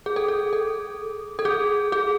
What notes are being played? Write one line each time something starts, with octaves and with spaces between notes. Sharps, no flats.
G#4
A4
G#4
A4
A4
G#4
G#4